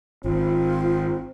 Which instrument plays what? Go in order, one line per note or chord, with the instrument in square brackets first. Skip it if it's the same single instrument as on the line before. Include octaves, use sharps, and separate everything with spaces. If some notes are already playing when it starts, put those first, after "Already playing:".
[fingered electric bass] G#1 [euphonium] C4 [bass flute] F4